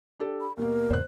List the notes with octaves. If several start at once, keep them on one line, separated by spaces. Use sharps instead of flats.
D4 G4 A4
B5
D#2 B2 A#3 A#4
E2 G#2 C#3 C5 F#6